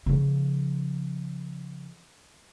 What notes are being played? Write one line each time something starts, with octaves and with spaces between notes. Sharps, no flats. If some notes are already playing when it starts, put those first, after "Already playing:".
C#3 F3